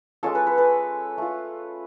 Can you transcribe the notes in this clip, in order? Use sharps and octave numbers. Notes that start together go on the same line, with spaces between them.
G#3 C#4 F4 A4
B4
B4
B4
A3 F4